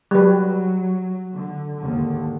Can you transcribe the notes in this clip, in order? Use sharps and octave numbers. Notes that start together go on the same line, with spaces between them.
F#3 G3 B4
D3
D#2 G#2 D3